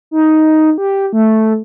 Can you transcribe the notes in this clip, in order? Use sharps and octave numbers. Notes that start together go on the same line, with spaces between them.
D#4
G4
A3